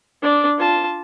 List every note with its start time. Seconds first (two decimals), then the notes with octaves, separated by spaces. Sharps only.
0.22 D4 D5
0.58 F4 A5